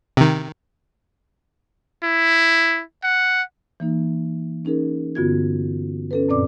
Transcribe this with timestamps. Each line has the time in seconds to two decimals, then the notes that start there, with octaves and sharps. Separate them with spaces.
0.17 C3 D#3
2.03 E4
3.04 F#5
3.80 E3 A#3 D#4
4.65 C#4 D#4 G#4 A#4
5.15 G2 D3 B3 F4 F#4 G#6
6.11 C#4 A4 B4
6.28 F#2 A#2 C4 D5 D6